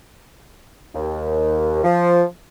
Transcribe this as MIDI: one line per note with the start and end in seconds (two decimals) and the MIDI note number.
0.95 1.81 39
1.83 2.24 53